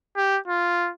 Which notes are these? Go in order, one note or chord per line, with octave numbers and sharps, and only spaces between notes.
G4
F4